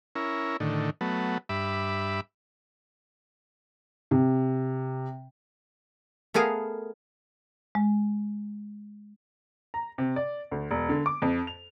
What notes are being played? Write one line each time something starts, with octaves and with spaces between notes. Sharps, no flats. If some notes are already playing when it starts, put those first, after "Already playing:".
C#4 E4 A#4
A2 D3 D#3
F#3 A3 B3
G2 E5 B5 D6
C3
A3 B3 G#4 A#4 F5
G#3
A#5
C3
D5
D2
E1
D3
D6
F2
F7